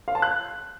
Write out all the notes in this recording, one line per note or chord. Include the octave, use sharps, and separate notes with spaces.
F5
A5
F#6